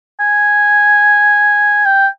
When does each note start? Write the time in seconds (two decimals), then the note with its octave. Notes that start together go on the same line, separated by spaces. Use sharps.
0.20 G#5
1.85 G5